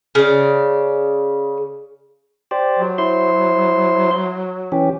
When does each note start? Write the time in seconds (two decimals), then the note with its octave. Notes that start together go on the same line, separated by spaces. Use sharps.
0.15 C#3 D5
2.51 G4 C5 D5
2.79 F#3
2.98 E4 C5 C6
4.72 E3 C#4 G4